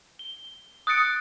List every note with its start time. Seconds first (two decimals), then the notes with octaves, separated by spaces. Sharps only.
0.19 G7
0.87 D#6 F#6 A6 C#7 D7